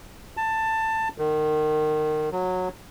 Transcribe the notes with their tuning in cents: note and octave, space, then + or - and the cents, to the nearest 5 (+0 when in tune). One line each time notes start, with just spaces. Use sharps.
A5 +15
D#3 -25
F#3 -15